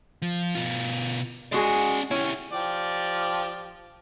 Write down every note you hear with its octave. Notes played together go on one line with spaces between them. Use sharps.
F3
B2 F4
G#3 C#4 F#4 G#4 D5
C#4 E4 G4
F3 G4 D5